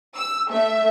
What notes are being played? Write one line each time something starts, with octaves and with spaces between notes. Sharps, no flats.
E6
A3 E5